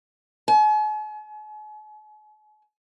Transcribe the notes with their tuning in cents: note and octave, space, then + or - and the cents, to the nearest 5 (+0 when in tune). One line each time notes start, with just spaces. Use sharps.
G#5 +45